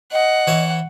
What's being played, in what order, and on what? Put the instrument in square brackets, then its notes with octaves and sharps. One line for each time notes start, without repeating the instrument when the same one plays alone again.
[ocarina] D#5 [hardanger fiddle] F#5
[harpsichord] E3 C#5 E5